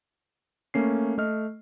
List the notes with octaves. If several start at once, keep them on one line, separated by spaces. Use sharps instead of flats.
A3 A#3 C#4 C7
A3 D#5 F6